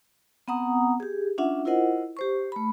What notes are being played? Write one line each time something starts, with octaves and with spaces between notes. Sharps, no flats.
B3 C4 F#5 A#5 D#6
G4 G#4
C#4 D4 F4 E5 F#5
E4 F4 A#4 C5 D#5 F#5
G4 C5 C#6
A3 B5